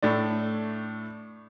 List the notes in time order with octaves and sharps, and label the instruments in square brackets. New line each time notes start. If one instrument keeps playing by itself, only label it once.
[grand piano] A2 A3 D4